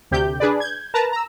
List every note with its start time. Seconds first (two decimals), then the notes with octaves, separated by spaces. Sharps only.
0.11 D2 C3 G4 G6
0.40 D4 G#4 B4 D5
0.60 G6 G#6
0.94 A#4 B4 A5 A#5
1.12 A#5 E6